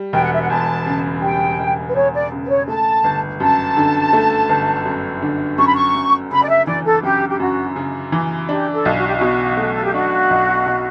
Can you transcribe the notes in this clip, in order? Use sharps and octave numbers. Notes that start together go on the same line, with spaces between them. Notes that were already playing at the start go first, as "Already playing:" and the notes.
Already playing: G3
E1 G5
F#5
E5
F#5
E2 A5
C#3
G3 G5
E1
B4
E2 C#5
D5
C#3
B4
C#5
A3 A5
G1
F#2 A5
D3
A3
G1
F#2
D3
F#2 C#6
B5
C#6
F#2
C#3 B5
D5
E5
E3 D5
A4
F#2 G4
G4
F#2 F#4
C#3
E3
D4 G4
A4
B1
F#4
G4
F#4
B2
A3
A4
G4
D4 F#4
B1
B2